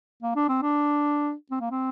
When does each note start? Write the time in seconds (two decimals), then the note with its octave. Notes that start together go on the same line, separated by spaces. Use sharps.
0.23 A#3
0.36 D4
0.49 C4
0.62 D4
1.51 C4
1.61 A#3
1.71 C4